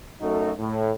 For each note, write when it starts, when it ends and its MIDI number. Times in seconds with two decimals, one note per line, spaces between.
0.21 0.52 42
0.21 0.52 57
0.21 0.52 63
0.21 0.52 66
0.21 0.52 69
0.58 0.92 45